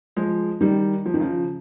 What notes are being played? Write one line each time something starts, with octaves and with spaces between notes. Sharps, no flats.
F3 G#3
D#3 G3
F3
D#3
C#3 F3